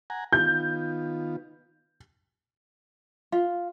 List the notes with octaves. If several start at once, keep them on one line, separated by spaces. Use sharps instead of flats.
F#5 G#5 A#5
D#3 B3 F4 G6
F4